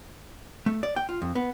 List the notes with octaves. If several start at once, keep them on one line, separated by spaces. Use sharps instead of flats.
A3
D5
G5
F4
F2
B3